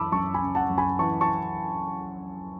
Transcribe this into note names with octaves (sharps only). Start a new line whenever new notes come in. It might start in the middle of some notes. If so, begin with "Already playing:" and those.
Already playing: F#2 E3 A5 B5 D6 E6
F#2 A5 C#6
G#5 B5
C#3
F#5 A5
F#2
G#5 B5
E3 A5 C#6
A5 C#6